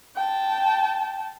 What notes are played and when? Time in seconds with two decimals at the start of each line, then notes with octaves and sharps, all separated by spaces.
0.16 G5 A5